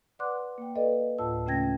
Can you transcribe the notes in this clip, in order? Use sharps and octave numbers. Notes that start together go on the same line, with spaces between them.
B4 D5 F#5 C6 D6 F#6
A#3 G5
A4 B4 D5 D#5 F5
D2 A2 F4 A5 E6
C#3 A3 C#4 G5 G#6 A#6